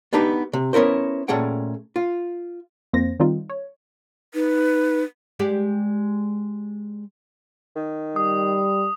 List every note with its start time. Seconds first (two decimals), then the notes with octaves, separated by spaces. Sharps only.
0.13 B3 D4 D#4 G4 B4
0.53 C3
0.73 B3 C#4 E4 A#4 C5
1.28 A#2 A3 C#4 G#4 F#5 G5
1.96 F4
2.93 F2 A#3 C4 C5 A#6
3.20 D#3 G3 C4 D#4 F4
3.50 C#5
4.34 D#4 B4
5.39 G#3 G4 D5
7.76 D#3
8.16 G3 D#6